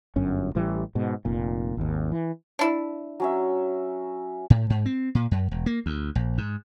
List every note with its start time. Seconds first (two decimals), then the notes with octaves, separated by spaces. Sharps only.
0.16 G1 F#2 C#4
0.55 A1 A2 E3 G3
0.95 G#2 B2
1.25 F1 A#2
1.77 G#1 D#2
2.12 E3
2.59 D4 E4
3.20 F#3 C#4 E5
4.50 A2
4.70 G#2
4.86 C4
5.15 A#2
5.31 F#2
5.51 E1
5.66 A#3
5.86 D2
6.15 A#1
6.38 G#2